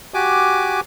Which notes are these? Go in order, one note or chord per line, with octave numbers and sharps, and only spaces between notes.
F#4 G4 G#5 D6